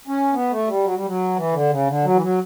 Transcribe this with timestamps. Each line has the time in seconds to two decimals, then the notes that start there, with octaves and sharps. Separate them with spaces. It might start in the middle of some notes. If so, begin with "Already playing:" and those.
0.08 C#4
0.33 B3
0.51 A3
0.68 G3
0.84 F#3
0.95 G3
1.06 F#3
1.36 E3
1.53 D3
1.70 C#3
1.87 D3
2.04 F#3
2.14 E3
2.21 F#3